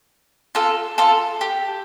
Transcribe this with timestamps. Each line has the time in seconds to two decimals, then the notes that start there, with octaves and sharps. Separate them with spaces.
0.55 F4 A4
0.98 F4 A4
1.41 G4